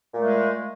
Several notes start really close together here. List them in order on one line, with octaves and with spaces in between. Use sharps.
A#2 A3 G#3